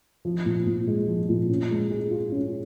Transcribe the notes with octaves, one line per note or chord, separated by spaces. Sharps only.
F3
A#2
A#2
G#3
F3
A#2
C#4
G#3
G#4
F4
C#4